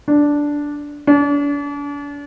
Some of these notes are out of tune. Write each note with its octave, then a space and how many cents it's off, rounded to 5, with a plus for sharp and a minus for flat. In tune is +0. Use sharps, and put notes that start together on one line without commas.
D4 -5
D4 -40